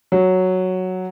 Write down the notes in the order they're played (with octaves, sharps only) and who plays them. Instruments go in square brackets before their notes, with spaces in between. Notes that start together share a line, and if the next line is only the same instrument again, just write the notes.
[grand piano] F#3